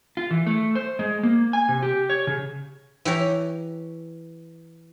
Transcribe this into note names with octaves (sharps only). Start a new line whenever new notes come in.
F4
E3
A3
C5
G#3
A#3
G#5
C3
G4
C#5
C#3
E3 G4 C#5 A#5